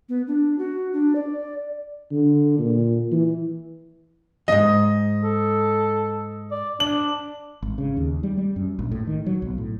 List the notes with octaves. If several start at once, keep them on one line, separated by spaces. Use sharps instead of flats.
B3
D4
F#4
D4
D5
D3
A#2
E3
F2 G#2 D#5
A4
D5
D4 F#7
G#1
C#3
D#2
G3
G3
F#2
A#1
A2
D#3
F#3
B1
A2